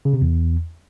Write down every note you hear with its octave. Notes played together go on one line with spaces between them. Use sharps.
C#3
C3
E2